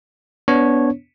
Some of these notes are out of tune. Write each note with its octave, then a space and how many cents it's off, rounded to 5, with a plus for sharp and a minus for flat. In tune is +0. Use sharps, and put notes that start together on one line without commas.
B3 +0 D4 -25 C#5 -10